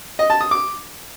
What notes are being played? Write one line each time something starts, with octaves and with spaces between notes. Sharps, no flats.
D#5
A5
D#6
D6